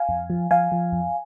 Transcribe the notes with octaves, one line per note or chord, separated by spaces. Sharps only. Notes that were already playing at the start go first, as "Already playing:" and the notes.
Already playing: F5 G#5
F2
F3
F3 F5 G#5
F3
F2